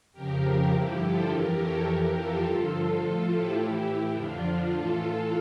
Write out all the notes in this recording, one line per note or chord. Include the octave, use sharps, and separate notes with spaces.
F2 C#3 F3 G4 A#4
G4 A#4
G2 D3 F3 E4 G4
F4 A4
F2 E3 G4 A#4
A4 C#5
F2 E3 G4 A#4
F4 A4
G2 D3 F3
A2 F3
E4 G4
A2 E3
F2 D3 F3 D4 F4
A2 E3 F4 A4
F4 A4